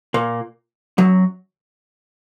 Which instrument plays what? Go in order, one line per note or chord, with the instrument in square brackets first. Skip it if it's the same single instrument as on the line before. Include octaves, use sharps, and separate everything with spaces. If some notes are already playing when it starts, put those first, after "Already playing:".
[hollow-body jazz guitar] A#2 A#3
F#2 F#3